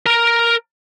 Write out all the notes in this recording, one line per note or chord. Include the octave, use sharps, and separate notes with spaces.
A#4 A#5